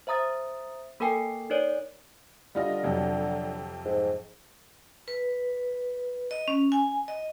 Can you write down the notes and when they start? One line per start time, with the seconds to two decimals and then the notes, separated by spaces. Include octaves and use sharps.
0.07 C5 E5 A#5 D#6 A6
1.00 A#3 A4 A#4 G5 G#5 C7
1.50 D#4 A#4 C#5 D5
2.55 D3 G3 F4 D#5
2.83 F2 C3 F#3
3.85 G#2
5.08 B4
6.31 D#5
6.48 C#4
6.72 G#5
7.08 D#5